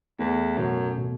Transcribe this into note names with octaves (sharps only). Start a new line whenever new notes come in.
E2 A3
F#2 B2
B2